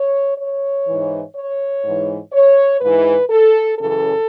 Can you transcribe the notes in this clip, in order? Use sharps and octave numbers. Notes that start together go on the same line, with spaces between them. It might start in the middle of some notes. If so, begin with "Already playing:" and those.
Already playing: C#5
C#5
G#2 E3
C#5
G#2 E3
C#5
G#2 E3 B4
A4
F#2 C#3 E3 A4